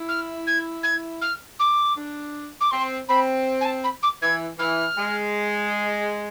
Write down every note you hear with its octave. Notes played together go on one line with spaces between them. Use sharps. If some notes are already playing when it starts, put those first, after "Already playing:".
Already playing: E4
F6
G#6
G#6
F6
D6
D4
D6
C4 C6
C4 B5
G#5
A5
B5
D6
E3 G#6
E3 F6
G#3